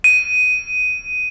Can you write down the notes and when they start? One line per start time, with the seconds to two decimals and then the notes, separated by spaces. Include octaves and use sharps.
0.04 D#7